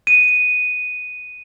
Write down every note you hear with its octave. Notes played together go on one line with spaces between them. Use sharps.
D#7